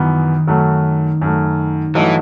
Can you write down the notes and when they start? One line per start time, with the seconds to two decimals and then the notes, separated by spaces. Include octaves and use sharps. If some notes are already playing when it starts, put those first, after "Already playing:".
Already playing: F#2 D#3 E3 B3
0.47 F#2 F#3 A3
1.21 F#2 F#3 A3
1.95 G2 E3 F#3 A3 D#4